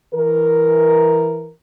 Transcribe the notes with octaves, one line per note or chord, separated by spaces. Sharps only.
E3 A#4